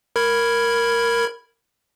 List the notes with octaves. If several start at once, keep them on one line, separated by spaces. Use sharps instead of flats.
A#4 B5 G#6